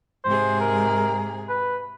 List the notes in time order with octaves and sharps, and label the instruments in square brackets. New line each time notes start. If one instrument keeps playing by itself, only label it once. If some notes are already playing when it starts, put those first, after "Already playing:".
[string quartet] G#2 C3 G#4 [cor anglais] C5
[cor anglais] A#4
B4